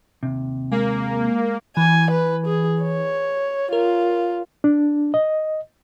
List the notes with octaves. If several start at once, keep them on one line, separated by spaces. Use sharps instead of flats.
D#2 C3
G#3 A#3
E3 G#5
B4
G#4
C#5
F4 A#4
D4
D#5